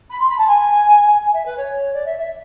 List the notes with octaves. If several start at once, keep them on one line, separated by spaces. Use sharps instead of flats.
B5
C6
B5
A5
G#5
G#5
E5
B4
C#5
D5
E5
E5